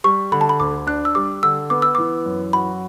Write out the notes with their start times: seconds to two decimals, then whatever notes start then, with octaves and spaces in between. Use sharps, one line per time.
0.04 G3 C#6
0.32 D3 B5
0.41 A5
0.49 B5
0.60 D2 D6
0.87 D4 F#6
1.05 E6
1.15 G3 D6
1.43 D3 E6
1.70 B3 D6
1.82 E6
1.95 E3 D6
2.26 F#2
2.53 F#4 B5